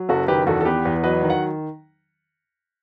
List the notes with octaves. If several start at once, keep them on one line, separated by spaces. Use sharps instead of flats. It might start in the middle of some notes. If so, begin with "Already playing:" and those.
Already playing: F#3
F#1 F#4 A4
D#3 G4 B4
E2 F#4 A4
A4
B3 G4 B4
E2
F#3 B4 D#5
D#3
F#5